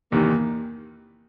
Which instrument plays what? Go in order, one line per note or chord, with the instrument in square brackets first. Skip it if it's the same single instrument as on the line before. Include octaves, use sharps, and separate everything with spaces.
[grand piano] E2 C3 D#3 [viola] A#3